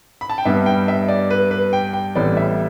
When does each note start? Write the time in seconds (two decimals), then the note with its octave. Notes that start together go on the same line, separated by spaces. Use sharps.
0.21 B5
0.30 A5
0.38 G5
0.45 G2 G3 B3 E5
0.66 G5
0.88 E5
1.08 D5
1.31 B4
1.51 B4
1.73 G5
1.93 G5
2.15 A1 A2 G3 B3 D5
2.37 E5